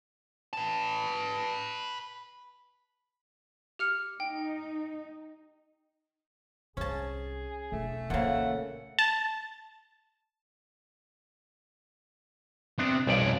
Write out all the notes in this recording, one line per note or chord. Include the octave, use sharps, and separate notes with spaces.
B4 A5
G4 F6 C#7
D#4 G5
C2 C#4 G#4 A5
E1 A3
A#2 C#3 E3 A#3 F#5
A5
C3 B3 D4
B1 F2 G3 C#4 D5